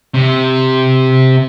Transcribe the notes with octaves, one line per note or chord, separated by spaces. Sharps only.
C3